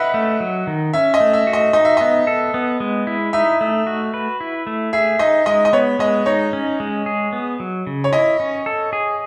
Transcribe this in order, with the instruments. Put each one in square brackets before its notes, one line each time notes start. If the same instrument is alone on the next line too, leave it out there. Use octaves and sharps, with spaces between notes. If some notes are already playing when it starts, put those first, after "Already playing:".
Already playing: [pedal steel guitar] B4 [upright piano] D#5 E5 F#5
[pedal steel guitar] A3
F#3
D#3
[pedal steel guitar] C#4 [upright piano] E5
[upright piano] D#5
[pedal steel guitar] A3
[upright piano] E5
[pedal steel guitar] F#4
[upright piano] D#5
[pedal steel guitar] D#4 [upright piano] D#5
[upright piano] E5
[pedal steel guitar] B3 [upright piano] D#5
[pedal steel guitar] A4
B3
G#3
E4
[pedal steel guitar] D#4 [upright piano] E5
[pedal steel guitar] A3
F#4
B4
E4
A3
[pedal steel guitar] G#4 [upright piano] E5
[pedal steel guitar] D#4 [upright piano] D#5
[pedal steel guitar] G#3 [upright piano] D#5
[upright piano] D#5
[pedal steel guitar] B3 [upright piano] C#5
[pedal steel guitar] G#3 [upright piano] D#5
[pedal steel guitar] D#4 [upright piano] C#5
[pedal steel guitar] C#4
G#3
G#4
B3
F#3
C#3
[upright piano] C#5
[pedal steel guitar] E4 [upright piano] D#5
[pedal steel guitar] C#4
A4
G#4